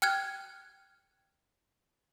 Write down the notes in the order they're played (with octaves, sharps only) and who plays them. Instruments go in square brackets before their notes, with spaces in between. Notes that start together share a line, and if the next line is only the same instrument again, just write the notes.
[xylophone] G5 F6 F#6 G#6